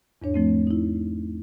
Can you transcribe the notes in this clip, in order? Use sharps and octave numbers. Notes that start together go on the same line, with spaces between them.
E2 G#2 D4 C#5
F3 A3 C4
D#4 E4